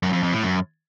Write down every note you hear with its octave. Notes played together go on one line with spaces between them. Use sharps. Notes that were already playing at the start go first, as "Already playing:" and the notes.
F#2
F2
F2
A2
F#2